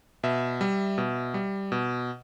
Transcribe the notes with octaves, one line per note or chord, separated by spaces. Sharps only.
B2 E5
G3
B2
G3
B2